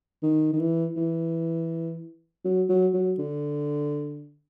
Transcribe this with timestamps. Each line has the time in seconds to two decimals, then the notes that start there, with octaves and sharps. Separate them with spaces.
0.23 D#3
0.53 D#3
0.60 E3
0.96 E3
2.45 F#3
2.69 F#3
2.94 F#3
3.19 D3